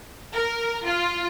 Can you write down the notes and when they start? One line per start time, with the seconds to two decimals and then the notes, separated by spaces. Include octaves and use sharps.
0.33 A#4
0.85 F4